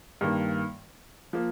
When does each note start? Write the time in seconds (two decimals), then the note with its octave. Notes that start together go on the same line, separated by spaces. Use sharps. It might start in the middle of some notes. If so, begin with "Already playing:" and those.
0.21 G2 D#3 A#3
1.33 F3 A#3